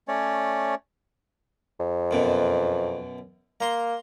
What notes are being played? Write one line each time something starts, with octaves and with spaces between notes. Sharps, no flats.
A3 C#4 C#5 D5
F2
F#2 B2
A#3 A#5 C6